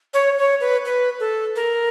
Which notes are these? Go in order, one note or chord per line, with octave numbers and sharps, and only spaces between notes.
C#5
C#5
B4
B4
A4
A#4